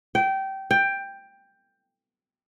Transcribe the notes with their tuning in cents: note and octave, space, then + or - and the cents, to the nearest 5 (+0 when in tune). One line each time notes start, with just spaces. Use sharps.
G5 -20
G5 +10